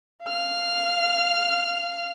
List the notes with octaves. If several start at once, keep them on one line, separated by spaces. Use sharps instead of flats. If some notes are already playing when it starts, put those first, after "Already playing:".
F5 F6